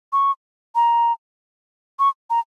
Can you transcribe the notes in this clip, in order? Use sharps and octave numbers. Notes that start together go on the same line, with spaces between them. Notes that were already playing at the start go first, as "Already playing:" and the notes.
C#6
A#5
C#6
A#5